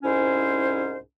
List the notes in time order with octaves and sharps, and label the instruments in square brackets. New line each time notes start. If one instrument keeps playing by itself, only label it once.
[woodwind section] C2 G#2 C#4 E4 C5